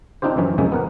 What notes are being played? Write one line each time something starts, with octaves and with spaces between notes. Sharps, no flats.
C4 D4 D#4 F4 G4 C5
F#2 E3 C#4
F2 C3 G#3 A#3 C#4
B3 A#4 F#5